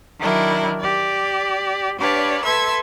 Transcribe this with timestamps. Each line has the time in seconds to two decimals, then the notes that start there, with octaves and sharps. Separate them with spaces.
0.19 D#3 F#3 D4 E4 A#4
0.80 G4 D5
1.99 D4 G4 B4 C#5 D5 F5
2.42 A4 B4 E5 C6 E6 G#6